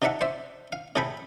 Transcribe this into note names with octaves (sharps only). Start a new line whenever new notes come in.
C3 D#4 D5 E5 F#5 A5
C5 D5 E5
F5
A2 C3 G#4 A4 G5 B5